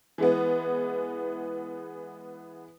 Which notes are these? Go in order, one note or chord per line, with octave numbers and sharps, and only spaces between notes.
E3 G#3 B3